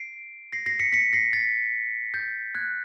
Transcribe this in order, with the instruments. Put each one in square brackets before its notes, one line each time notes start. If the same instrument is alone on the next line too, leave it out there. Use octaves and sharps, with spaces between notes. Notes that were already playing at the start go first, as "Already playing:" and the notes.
Already playing: [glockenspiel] C7 D7
A#6 C7
A#6 C7
B6 C#7
B6 C#7
A#6 C7
A6 B6
G6 A6
F#6 G#6